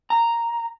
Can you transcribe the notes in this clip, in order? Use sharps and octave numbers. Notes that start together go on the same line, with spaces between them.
A#5